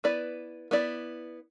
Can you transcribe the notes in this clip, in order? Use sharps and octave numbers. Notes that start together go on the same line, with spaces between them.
B3 E4 B4 D5
B3 E4 D5